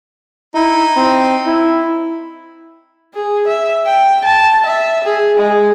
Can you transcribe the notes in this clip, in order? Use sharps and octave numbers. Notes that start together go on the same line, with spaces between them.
D#4 E4
C4
E4
G#4
E5
G5
A5
E5
G#4
G#3